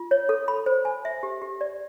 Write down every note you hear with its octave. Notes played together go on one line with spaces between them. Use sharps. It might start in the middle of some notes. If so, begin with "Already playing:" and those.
Already playing: F4
C#5
A4
B5
C5
G#5
E5
G4
G4
D5